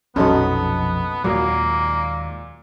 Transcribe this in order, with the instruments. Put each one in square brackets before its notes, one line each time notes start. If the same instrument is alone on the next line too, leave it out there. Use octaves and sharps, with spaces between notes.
[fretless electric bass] A#1 F2 B2 [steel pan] F#3 C#4 [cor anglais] B3 [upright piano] D#4 A4
[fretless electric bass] D#2 G#3 [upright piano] A#2 [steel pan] F#3 [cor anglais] A#3